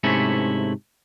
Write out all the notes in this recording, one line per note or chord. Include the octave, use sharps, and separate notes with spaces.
G#2 C3 A3 C#4 E4